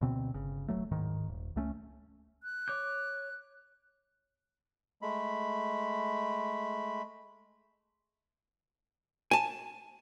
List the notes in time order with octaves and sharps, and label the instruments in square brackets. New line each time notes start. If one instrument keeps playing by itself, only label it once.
[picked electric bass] D2 B2 C4
G1 C#3
D1 F2 F#3 A3
D1 G#2 D#3
D#1
C#2 A3 C#4
[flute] F#6
[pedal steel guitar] C#5 D6 G6
[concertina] G#3 A3 B5
[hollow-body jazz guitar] G#5 A5